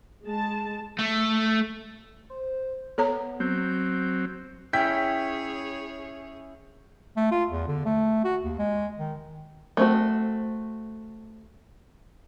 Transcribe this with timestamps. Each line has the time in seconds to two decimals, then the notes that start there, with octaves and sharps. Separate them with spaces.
0.25 G#3 A5
0.99 A3
2.30 C5
2.98 B3 A4 C#5 A#5
3.40 F#3 C4 G6
4.73 C#4 E4 G#4 C#5 G5 G6 B6
7.16 A3
7.31 F4
7.50 E2
7.67 D3
7.85 A3
8.24 F#4
8.43 D#2
8.58 G#3
8.99 D#3
9.77 A3 C4 F#4